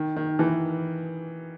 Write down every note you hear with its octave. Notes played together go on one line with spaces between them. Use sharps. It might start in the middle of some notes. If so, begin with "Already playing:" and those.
Already playing: D#3
D#3
E3